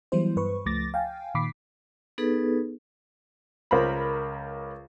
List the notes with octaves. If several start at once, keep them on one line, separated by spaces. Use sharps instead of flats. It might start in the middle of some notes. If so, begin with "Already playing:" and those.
E3 F#3 G3 B3 E4 C5
G2 B4 C#6
C#2 F3 A3 D6 A6 A#6
F5 G5 G#5
A#2 D#3 B5 D6 B6 C7
B3 D#4 G#4 A4 B4
C#2 A#4 C5 B5